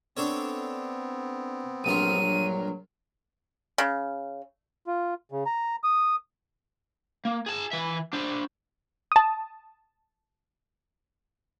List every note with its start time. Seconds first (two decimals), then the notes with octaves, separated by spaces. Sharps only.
0.17 B3 C4 D4 A4 C#5
1.84 A#1 G2 F#3 F4 D#7
3.78 C#3
4.87 F4
5.32 C#3
5.46 A#5
5.84 D#6
7.25 A#3
7.46 G#4 A5
7.71 E3 E5
8.13 D4 C5
9.12 A5 D#6